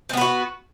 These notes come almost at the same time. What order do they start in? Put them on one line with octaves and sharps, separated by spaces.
C4 B3 B4 F#4